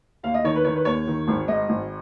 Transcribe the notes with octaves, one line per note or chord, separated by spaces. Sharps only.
D#2 F5
D#5
D#3 C#5
B4
D#3 C#5
B4
D#2 C#5
D#3
G#1
G#2 D#5
G#1